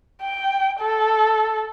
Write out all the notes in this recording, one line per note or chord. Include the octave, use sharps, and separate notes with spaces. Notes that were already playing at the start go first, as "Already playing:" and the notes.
G5
A4